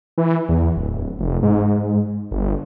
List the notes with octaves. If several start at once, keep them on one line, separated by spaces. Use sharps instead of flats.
E3
E2
D1
F1
G#2
G1